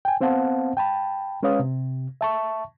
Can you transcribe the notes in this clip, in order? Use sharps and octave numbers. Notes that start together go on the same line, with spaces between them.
G5 G#5
B3 C4 C5 F5 F#5 A5
G5 A5 B5
G#3 C#4 B4 C#5 F5 D#6
C3
E5 A5 C#6